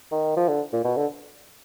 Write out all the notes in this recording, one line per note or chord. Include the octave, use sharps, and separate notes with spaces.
D#3
F3
D3
A#2
B2
D3